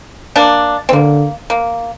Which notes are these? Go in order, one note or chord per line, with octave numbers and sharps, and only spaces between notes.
A#3 D4
C4
D3 A#3
A#3